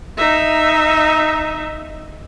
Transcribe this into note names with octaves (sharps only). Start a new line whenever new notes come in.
D#4 E5